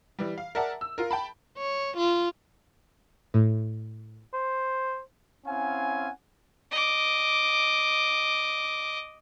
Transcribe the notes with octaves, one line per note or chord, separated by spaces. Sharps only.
E3 G3
F5
A#4 D5 E5 F#5 A5
E6
F4 A#4
G5 A5 B5
C#5
F4
A2
C5
C4 C#4 E4 F5 F#5 G#5
D#5 D6